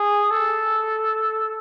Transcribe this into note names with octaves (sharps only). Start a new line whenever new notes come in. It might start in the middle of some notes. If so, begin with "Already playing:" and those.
Already playing: G#4
A4